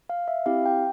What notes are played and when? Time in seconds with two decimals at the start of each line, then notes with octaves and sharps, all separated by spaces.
0.09 F5
0.28 E5
0.46 C4 E4 G4 F5
0.66 G5